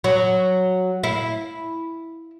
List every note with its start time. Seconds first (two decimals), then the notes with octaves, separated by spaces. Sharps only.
0.04 F#3
1.03 E4